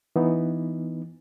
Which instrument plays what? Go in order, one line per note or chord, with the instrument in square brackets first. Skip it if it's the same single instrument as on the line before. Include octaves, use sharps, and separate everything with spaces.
[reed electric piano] E3 B3 D#4